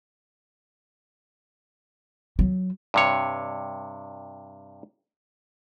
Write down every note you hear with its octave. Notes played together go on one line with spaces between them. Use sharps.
F#3
G2 C3 C#5